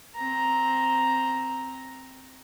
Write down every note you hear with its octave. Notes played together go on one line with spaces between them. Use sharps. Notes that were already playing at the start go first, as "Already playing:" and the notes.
C4 A#5